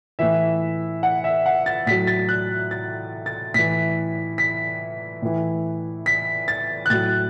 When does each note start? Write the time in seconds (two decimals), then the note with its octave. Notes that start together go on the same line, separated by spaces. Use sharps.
0.19 A2 E3 E5
1.03 F#5
1.24 E5
1.46 F#5
1.66 A6
1.86 A2 F#3 B6
2.07 A6
2.29 F#6
2.71 A6
3.26 A6
3.54 A2 E3 B6
4.38 B6
5.22 A2 E3
6.06 B6
6.48 A6
6.86 F#6
6.90 A2 F#3 A6